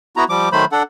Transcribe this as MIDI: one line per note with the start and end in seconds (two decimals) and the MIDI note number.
0.17 0.24 59
0.17 0.24 64
0.17 0.24 66
0.17 0.24 82
0.29 0.49 53
0.29 0.49 55
0.29 0.49 86
0.52 0.65 51
0.52 0.65 54
0.52 0.65 57
0.52 0.65 72
0.52 0.65 83
0.72 0.83 62
0.72 0.83 69
0.72 0.83 78